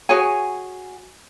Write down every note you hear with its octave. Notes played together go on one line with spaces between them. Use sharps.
F#4 G#4 C#5 G#5